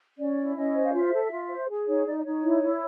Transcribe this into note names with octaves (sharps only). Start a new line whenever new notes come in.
C#4 D5
E4
C#4 D#5
C5
F5
F4 E5
A4
F4
C5
G#4
D#4 C#5
D#4 D5
D5
D#4 C#5
E4
E4